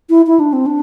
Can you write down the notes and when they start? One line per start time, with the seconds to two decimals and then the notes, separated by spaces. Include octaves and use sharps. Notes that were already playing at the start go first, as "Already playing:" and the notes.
0.10 E4
0.27 E4
0.40 D4
0.53 C4
0.66 D4